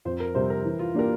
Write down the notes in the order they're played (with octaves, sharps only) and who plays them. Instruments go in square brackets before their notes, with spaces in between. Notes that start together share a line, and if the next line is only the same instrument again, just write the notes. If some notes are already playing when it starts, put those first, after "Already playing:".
[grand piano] F2 [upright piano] C5
[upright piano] A#4
[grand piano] C3 G3 C4 [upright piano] C5
[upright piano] A#4
[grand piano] E3
[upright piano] F4
[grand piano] A#3 D4 G4 [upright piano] A#4